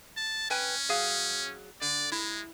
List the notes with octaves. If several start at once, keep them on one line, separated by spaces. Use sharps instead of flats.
A5
C#4 B4 G5 G#5
F#3 G#4 F5
D3 D5
G#3 E4